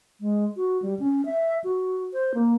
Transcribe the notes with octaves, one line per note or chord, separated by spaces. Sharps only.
G#3
F#4
G3
C#4
E5
F#4
C5
A#3